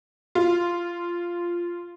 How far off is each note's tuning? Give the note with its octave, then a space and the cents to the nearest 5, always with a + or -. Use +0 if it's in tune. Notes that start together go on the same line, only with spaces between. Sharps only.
F4 -10